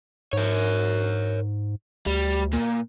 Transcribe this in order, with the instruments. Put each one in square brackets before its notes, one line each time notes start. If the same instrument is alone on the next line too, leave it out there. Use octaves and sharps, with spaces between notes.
[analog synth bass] G#2 [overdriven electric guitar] A#4 C#5
[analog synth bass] D2 [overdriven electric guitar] G3
[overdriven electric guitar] A#2